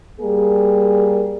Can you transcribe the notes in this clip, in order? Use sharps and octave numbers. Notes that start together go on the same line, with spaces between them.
G3 A#3 G#4